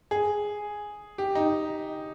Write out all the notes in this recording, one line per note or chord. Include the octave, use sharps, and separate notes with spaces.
G#4
G4
D#4